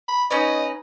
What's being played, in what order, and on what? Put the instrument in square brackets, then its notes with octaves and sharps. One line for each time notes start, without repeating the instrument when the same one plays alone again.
[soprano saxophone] B5
[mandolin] C#4 D#4 B4 [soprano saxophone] D#5